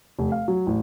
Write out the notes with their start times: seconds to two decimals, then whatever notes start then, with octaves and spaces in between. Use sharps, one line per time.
0.19 F1
0.32 F5
0.48 F#3
0.67 A1